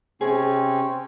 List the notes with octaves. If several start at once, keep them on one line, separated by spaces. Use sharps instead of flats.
C3 C4 C#4 G#4